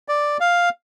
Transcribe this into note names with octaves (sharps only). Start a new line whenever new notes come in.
D5
F5